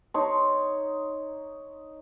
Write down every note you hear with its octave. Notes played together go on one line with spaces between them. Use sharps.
D#4 C#5 C6